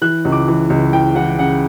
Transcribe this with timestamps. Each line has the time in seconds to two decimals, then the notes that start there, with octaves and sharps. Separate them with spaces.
0.02 E3 F#6
0.25 C#2
0.32 D6
0.48 E3
0.70 C#2
0.93 E3 G5
1.16 E3 F#5
1.39 C#3 F#5